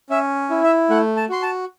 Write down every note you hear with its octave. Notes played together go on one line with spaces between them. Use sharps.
C#4 E5
E4
E5
A3 F#5
A5
F#4 C6
A5